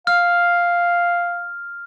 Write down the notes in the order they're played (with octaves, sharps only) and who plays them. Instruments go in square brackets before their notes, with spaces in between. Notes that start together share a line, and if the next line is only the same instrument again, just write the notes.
[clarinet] F5 [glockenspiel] F6